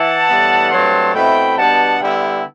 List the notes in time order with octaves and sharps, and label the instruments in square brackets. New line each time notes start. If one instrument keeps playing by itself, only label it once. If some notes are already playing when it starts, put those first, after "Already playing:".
Already playing: [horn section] E3 E4 F#5 A5
A2 E3 G3 B3
G2 F#3 A3 C4 A5 C6
B2 A3 C4 E4 G5 B5
B2 G3 B3 D4 F#5 A5
D3 G3 B3 E4 E5 G5